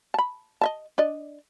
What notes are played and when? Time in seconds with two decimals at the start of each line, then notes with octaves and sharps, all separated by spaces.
0.14 A5 B5
0.61 D#5 E5 A5
0.98 D4 D5 D#5